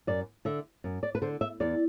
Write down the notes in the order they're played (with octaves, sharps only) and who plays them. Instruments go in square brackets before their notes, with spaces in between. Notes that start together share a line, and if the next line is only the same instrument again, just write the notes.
[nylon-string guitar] F#2 D5
D3 E5
F#2
D5
B4
D3 C5
E5
E2 D5